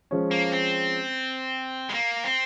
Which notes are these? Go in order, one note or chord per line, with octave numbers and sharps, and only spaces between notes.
F3 G#3 C#4
A#3
C4
G#3
A#3
C4